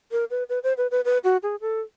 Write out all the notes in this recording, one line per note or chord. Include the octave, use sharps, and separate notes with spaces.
A#4
B4
B4
C5
B4
B4
B4
F#4
G#4
A4